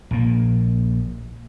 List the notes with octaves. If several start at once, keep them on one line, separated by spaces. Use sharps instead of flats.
A#1 A#2 A#3